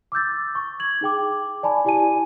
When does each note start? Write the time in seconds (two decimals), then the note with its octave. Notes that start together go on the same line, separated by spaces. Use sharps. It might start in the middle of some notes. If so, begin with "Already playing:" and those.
0.12 D6 E6 G6 A6
0.55 C#6
0.80 G#6 F#7
1.01 D#4 G#4 G5 D6
1.63 D5 G#5 A5 B5
1.85 E4 G4 D5 G#5 A5 D#7